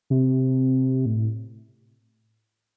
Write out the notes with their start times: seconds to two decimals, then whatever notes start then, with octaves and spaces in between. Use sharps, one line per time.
0.10 C3
1.06 A2